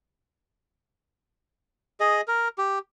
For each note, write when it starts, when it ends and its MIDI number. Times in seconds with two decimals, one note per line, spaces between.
2.00 2.21 68
2.00 2.21 75
2.28 2.48 70
2.58 2.79 67